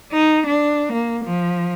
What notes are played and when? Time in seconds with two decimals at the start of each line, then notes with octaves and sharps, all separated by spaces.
0.13 D#4
0.47 D4
0.93 A#3
1.25 F3